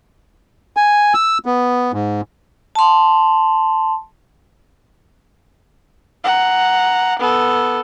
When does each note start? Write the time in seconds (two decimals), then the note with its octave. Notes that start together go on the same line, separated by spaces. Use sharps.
0.77 G#5
1.14 E6
1.46 B3
1.93 G#2
2.75 A5 C6
6.24 F#5 A#5
7.19 B3 A4